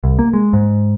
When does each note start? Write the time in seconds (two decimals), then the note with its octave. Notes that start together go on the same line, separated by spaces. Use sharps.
0.04 C2
0.19 A#3
0.34 G#3
0.53 G#2